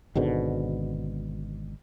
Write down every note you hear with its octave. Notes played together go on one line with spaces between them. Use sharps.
G#1 G#2 B2 D3